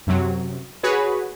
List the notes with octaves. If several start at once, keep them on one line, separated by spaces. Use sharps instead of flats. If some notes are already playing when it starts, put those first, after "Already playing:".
F#2 C3 F#3
F#4 G#4 B4 C#5